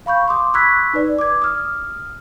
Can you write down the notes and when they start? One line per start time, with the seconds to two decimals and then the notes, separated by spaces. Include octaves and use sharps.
0.06 F5 B5 C#6 G6
0.28 C6 D6 D#6
0.54 B5 C#6 E6 F#6 G#6 B6
0.93 D#4 B4 D5
1.19 D6 G#6
1.42 D#6 F6